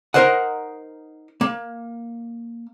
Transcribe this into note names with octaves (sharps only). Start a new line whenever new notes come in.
D#4 A#4 C5 D#5 F#5
A#3